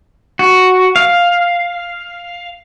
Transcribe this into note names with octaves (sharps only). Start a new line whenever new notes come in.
F#4
F5